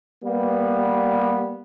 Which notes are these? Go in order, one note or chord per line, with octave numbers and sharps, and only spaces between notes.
G3 A#3 B3